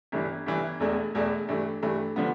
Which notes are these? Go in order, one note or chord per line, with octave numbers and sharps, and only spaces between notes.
G1 G2 E3
G1 G2 E3
E1 E2 B2 A3 D4
E1 E2 B2 A3 D4
G2 E3 A3
G2 E3 A3
D3 F3 B3